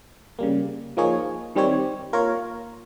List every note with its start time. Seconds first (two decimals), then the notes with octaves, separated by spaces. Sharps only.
0.39 C#3 G3 A#3
0.97 F3 A#3 D#4 G#4 C#5
1.56 D#3 G3 C4 G4 C#5
2.13 A#3 F4 A#4 C#5